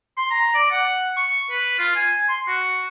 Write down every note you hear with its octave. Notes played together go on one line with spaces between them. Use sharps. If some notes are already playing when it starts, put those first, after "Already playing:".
C6
A#5
D5
F#5
C#6
B4
F4
G#5
C6
F#4